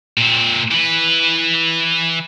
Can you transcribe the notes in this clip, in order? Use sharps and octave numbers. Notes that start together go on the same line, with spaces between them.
A#2 C4
E3 B4